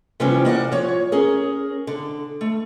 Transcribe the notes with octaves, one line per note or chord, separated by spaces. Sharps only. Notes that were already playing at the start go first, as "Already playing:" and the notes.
C3 E3 F3 G3 B3 C#4
A#3 D5 F5 F#5
F3 C#5
C#4 G#4 A#4
D3
A3